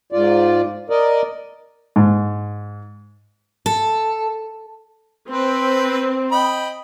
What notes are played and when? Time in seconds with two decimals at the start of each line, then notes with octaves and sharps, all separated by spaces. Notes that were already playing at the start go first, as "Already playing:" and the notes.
0.12 G#2 F4 D5
0.90 A#4 D5 D#5
1.96 G#2
3.66 A4
5.30 C4 B4
6.32 D#5 G5 B5